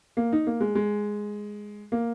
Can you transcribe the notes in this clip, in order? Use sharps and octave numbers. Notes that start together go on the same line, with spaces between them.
A#3
D#4
A#3
G#3
G#3
A#3